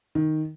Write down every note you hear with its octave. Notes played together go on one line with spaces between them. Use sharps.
D#3